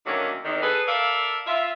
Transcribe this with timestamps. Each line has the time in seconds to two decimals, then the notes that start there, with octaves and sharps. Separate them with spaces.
0.06 D3 D#3 F#3 A3 A#3 C#4
0.44 E2 C3 D#3
0.62 G#4 A4 B4
0.87 A4 A#4 D5 E5 F5
1.46 F4 E5